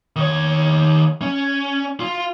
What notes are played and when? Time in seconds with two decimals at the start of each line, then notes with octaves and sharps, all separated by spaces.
0.16 D#3 C#5
1.22 C#4
2.00 F4